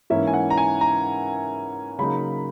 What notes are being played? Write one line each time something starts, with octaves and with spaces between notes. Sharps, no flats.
G#2 E3 A#3 C#4 E4 E5
G#5
F#5
A#5
G#5
A#5
C#3 F#3 A#3 D#4 B5